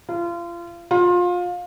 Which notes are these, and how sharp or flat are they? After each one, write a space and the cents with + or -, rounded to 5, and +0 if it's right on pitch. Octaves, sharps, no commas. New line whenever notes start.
F4 -30
F4 +25